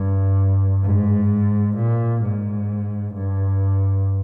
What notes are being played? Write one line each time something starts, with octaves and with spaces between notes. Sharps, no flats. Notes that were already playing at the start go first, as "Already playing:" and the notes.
Already playing: G2
G#2
A#2
G#2
G2